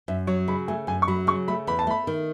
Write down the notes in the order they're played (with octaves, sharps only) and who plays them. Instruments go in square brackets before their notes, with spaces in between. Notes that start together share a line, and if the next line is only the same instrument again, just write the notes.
[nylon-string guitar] F#2 [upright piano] E5
[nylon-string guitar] F#3 [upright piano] C#5
[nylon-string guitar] C#3 [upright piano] B5
[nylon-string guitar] A3 [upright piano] G#5
[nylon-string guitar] F#2 [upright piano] G#5
[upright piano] C#6
[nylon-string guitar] F#3 [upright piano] B5
[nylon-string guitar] C#3 [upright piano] C#6
[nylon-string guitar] A3 [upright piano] B5
[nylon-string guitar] E2 [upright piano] B5
[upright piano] A5
[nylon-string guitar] A3 [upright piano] B5
[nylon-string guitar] D#3